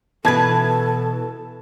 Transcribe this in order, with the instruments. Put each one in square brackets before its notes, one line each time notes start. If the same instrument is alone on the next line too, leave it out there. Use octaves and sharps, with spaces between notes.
[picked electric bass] B2 B3 [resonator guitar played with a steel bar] E3 B4 [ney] A4 [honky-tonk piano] A5 G#6